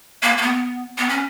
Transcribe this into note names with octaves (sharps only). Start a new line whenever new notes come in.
A#3
A#3
B3
B3
C#4